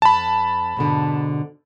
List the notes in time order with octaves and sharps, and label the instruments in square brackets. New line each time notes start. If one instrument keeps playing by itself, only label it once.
[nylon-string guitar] F2 [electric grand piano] A5 B5
[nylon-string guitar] G#2 B2 D3